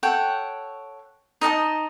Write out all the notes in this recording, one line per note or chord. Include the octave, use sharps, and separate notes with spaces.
A4 C#5 F#5 G5
D#4 D#5 F#5 A5